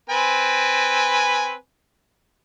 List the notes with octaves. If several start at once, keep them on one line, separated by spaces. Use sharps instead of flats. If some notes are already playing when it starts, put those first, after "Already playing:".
C4 B4 G#5